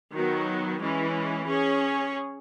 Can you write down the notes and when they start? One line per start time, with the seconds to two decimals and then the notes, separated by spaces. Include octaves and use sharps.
0.14 D#3 F#3 B3 F#4
0.80 E3 G#3 C#4 E4
1.46 C#4 G#4 C#5